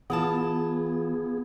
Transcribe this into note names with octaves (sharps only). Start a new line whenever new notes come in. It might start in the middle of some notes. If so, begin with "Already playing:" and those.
E3 B3 F4 G#4 A5